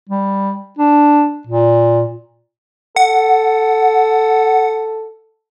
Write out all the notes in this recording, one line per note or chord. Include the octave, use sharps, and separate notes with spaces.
G3
D4
A#2
A4 F#5